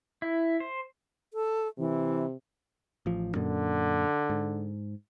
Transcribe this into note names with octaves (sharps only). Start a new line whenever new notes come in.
E4
C5
A4
C3 E3
A1 F3
F#2 A#2 D3
G#2